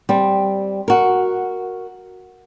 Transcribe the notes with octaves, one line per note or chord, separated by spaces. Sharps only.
G3 C4
F#4 A#4